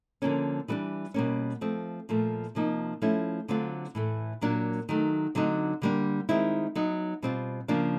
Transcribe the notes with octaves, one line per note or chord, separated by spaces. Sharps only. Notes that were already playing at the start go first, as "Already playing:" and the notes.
D3 F3 A#3 C#4
E3 G3 B3 D4
B2 G3 A#3 C#4
F3 A3 C4
A#2 F3 A3
C3 F3 A#3 D#4
F3 A3 C#4 E4
D3 F#3 A3 C4 F4
A2 E3 A3
A#2 F#3 A#3 D4 F4
D#3 F#3 A3
D3 F#3 A3 C4 D#4
D3 G3 A#3 D4
D#3 G#3 C4 E4
F#3 B3 D#4
B2 G3 C4 F4
C#3 F3 A#3 D4 F4